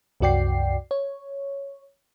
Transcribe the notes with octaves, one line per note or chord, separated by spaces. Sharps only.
C2 F#2 F#4 D5 G5 C7
C#5